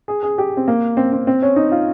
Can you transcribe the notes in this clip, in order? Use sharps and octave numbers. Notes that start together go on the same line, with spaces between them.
G#4
G#4
G4
C4
A#3
C4
C4
C4
C#4
D#4
F4